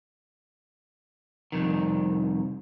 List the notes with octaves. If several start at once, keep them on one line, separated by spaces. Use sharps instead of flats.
C2 F2 D#3